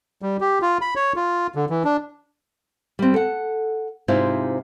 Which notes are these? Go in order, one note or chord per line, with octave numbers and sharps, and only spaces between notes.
G3
G4
F4
B5
C#5
F4
D3
E3
D4
G3 C4
A4 F#5
G#2 C3 E4 F4 C5